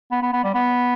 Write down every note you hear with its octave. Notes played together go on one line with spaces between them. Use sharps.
B3
B3
B3
G3
B3